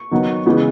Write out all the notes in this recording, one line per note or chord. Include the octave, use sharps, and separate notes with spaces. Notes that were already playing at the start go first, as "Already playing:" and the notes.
Already playing: C#6
D#3 F#3 B3
C#3 E3 G#3 B3